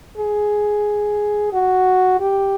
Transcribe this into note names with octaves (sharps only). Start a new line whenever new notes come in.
G#4
F#4
G4